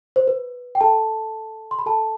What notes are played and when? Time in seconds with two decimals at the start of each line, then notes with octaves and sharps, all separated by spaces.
0.16 C5
0.27 B4
0.75 G5
0.80 A4 A5
1.71 C6
1.79 B5
1.86 A4 A5